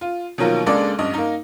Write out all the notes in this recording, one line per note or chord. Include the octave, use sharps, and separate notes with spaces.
F4
B2 D#3 F3 F#3 A#3
C#2 G#3 A#3 D4 A4 D5
A1 G2 D#5
A#3 D#4